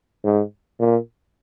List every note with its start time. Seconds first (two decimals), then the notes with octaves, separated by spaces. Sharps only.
0.25 G#2
0.80 A#2